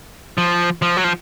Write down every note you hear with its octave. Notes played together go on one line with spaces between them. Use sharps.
F3
F3
F#3
F3